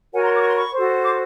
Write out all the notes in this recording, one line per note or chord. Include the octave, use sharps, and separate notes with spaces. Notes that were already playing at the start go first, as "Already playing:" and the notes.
F#4 A#4 C#5 F#5 G#5
A#5 C6
D6
C#6
C6
B5 C#6
F#4 A4 C5
C6 D6